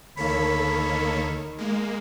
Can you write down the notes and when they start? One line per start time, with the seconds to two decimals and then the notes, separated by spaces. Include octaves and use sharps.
0.17 D2 D#3 A#3 A4 C#5 B5
1.58 G#3 A#3